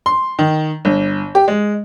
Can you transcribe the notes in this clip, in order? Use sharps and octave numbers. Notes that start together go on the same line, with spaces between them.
C6
D#3
G1
G4
G#3